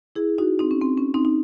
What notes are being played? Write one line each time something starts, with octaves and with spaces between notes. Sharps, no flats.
E4 G#4
D#4 F#4
C4 D#4
C#4
C4
C#4
C4 D#4
D#4